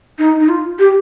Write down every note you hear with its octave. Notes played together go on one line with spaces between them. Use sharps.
D#4
D#4
F4
G4